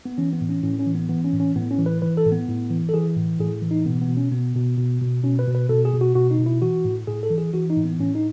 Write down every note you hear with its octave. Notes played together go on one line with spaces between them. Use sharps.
B3
E3 C#4
B3
A2
C#4
A2 C#4
C#4
E3
B3
E3 B3
C#4
A2
C#4
A2 B3
C#4
E3
B4
E3 B4
A4
A2
B3
A2
E3
A4
E3 G#4
A2
A2 G#4
E3
D#4
B2 B3
B3
B2
C#4
B2 B3
B2
B2
B2
B2 C#4
B4
B2
B4
B2 A4
G#4
B2
F#4
B2 F#4
D#4
B2
E4
E3 F#4
A2
A2 G#4
A4
E3
G#4
E3 F#4
D#4
A2
B3
A2 C#4
D#4